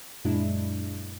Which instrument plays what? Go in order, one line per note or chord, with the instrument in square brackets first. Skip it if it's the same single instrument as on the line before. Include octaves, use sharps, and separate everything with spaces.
[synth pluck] F#2 A#2 G#3 D4 E4